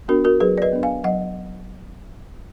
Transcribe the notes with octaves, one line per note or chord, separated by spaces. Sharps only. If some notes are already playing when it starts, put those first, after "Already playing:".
B3 D4 F#4 A#4
F#4 A#4
F#3 G#4 B4
D5
B4 D#5
B3 D4
F5 G#5
F#3 D#5 F#5